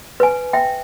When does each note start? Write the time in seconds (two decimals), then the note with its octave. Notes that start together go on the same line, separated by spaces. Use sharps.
0.20 B4 G#5
0.53 E5 G5